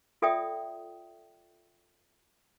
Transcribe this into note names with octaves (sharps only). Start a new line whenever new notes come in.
F4 A4 D5 E5 G5 D#6